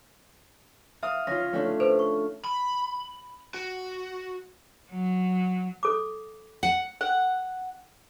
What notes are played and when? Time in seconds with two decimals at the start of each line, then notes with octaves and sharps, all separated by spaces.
1.03 E5 F5 D#6
1.27 C#4 F4 A#6
1.53 A3 C#4 D4
1.80 A4 B4 C5
1.99 C#6
2.45 B5
3.54 F#4
4.91 F#3
5.83 A4 D6
6.63 F#5
7.01 F#5